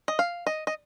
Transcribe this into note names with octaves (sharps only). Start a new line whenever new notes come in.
D#5
F5
D#5
D#5